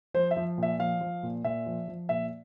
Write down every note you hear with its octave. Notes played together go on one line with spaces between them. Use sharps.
F3 C5
E5
F3
A#2
E5
F3 F5
F3
A#2
A#2 E5
F3
F3
A#2 E5